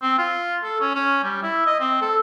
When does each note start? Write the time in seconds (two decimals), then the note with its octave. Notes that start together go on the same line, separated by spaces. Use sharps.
0.02 C4
0.18 F4
0.64 A4
0.80 C#4
0.95 C#4
1.24 G3
1.43 E4
1.66 D#5
1.80 C4
2.01 A4